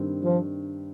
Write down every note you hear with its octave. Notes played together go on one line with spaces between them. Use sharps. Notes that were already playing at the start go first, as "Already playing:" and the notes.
Already playing: G2 D#3 G3 C4
F3